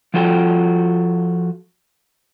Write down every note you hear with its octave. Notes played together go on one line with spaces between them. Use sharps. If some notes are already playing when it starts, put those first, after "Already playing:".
F3 F4 F#4 A4 G5